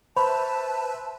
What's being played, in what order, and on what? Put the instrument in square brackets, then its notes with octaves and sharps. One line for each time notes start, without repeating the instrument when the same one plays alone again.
[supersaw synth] B4 E5 [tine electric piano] C5 [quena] A5 [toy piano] B5 C#6